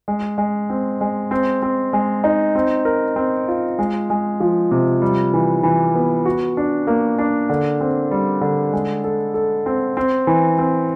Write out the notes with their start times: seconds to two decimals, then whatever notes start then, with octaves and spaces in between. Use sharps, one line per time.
0.08 G#3
0.38 G#3
0.70 C4
1.01 G#3
1.31 C4
1.62 C4
1.93 G#3
2.24 D#4
2.55 C4
2.85 A#4
3.16 C4
3.48 F4
3.79 G#3
4.10 G#3
4.40 F3
4.71 C3
5.02 G3
5.34 E3
5.63 E3
5.95 B3
6.25 F#4
6.57 D4
6.87 A#3
7.18 D4
7.50 D3
7.81 C4
8.11 G3
8.41 D3
8.73 G#3
9.04 A4
9.34 A4
9.66 C4
9.97 C4
10.27 E3
10.58 C4